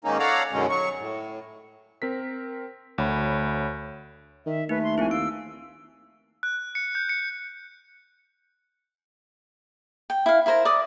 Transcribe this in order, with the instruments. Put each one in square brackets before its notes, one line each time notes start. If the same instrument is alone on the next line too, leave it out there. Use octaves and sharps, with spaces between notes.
[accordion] G#2 D#3 A#3 C#4 D#4
A4 C#5 D5 F5 F#5 A#5
F#2 B2 D3 D#3 G#3 C#4
F#3 C#6
A2
[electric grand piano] C4 A#4 B6
D2 C#5 B5
[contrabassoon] D#3 [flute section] E5
[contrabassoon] D#2 [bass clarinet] A3 [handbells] D#4 [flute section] B4
[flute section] C6
[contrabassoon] A#1 [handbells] C4 E4 [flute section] G#5
[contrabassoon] D#2 [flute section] F5 E6 [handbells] D7
[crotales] F#6
C#7
G6
C#7
[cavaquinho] G5
E4 F5
E4 A#4 C5 A#5
D5 D6 D#6